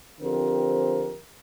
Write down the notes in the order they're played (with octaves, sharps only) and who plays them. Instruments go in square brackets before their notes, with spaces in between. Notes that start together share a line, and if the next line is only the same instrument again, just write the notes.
[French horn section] D3 F3 C4 G4 A#4